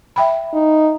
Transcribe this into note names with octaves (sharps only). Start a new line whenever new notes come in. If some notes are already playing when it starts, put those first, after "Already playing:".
E5 G5 B5
D#4